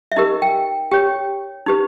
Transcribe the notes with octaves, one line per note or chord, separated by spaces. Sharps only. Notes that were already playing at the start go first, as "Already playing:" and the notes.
E5
D#4 G4 A#4 D#5
G5
G4 C#5 G5
D#4 G4 B4